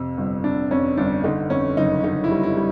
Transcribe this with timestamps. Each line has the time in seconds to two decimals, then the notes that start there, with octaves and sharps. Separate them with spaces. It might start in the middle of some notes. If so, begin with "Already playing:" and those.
Already playing: F2 C3
0.17 G1
0.44 C3 D4
0.71 F2 C#4
0.97 G1 D4
1.24 D3 D#4
1.50 F2 C#4
1.77 F#1 D#4
2.04 D3 D#4
2.24 E4
2.31 G3
2.43 E4
2.57 G3